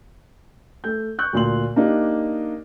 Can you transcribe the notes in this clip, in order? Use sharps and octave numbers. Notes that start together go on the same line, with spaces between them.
A3 G6
C#6 F#6 G6
D2 A#2 C6 F#7
A#3 D4 D#4 G4